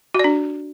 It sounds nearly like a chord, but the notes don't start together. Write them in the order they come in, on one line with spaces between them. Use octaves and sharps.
F#4 D5 D4